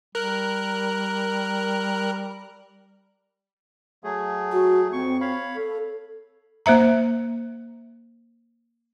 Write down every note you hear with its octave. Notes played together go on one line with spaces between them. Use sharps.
G3 A#4 F#6
F#3 A3 G#4
F#4
F2 C4 C#6
C#5 F5 B5
A4
A#3 C5 E5 A#5